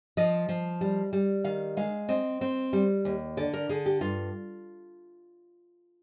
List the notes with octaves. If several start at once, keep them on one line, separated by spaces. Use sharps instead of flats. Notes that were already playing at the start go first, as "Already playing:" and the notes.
F3 D#5
F3
G3
G3
D#3 F5
G#3 F5
C4 D#5
C4
G3
D#2
D3 D5
A#4
D3 G#4
G4
G2 F4